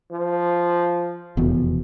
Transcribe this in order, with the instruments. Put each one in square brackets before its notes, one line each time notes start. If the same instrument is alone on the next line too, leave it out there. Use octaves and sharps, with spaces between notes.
[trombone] F3
[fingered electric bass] F1 E2 B2